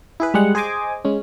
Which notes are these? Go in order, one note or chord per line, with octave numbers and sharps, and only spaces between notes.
E4 G#4 B4
G3 G#3 F#5
G#4 C5 D#5 G#5 D6
G#3 C#4